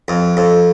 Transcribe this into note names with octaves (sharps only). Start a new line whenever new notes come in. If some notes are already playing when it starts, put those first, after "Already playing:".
F2
F2